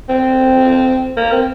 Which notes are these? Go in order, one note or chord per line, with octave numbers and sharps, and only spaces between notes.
C4
A#3
C4